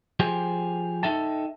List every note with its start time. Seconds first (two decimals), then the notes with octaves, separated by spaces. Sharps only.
0.20 F3 G4 G#4 C5
1.03 D#4 A4 E5 G5 A5